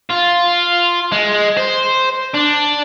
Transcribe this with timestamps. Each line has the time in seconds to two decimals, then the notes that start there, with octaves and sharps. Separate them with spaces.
0.11 F4
1.12 G#3
1.57 C5
2.35 D4